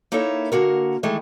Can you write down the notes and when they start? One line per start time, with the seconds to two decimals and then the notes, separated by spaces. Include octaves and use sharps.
0.12 A#3 D#4 E4 A4 C#5
0.52 D3 A#3 F#4 A#4
1.03 D#3 E3 G#3 A3